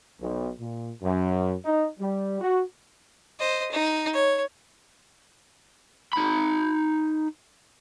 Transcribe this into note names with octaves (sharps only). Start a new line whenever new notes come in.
B1
A#2
F#2
D#4
G3
F#4
C5 D#5
D#4
C#5
D#4 B5